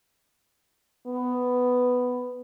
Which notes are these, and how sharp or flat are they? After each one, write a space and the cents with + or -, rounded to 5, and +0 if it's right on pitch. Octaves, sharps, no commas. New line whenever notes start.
B3 +10